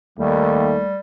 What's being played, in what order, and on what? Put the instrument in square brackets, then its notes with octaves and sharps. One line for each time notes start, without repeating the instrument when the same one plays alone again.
[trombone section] D#2 A3 [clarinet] G3